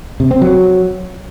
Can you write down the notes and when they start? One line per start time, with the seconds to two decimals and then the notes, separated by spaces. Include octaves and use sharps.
0.20 C3
0.31 C4
0.42 F#3